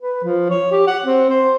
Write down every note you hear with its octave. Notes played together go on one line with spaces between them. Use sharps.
B4
F3
C#5
G4
F#5
C4
C5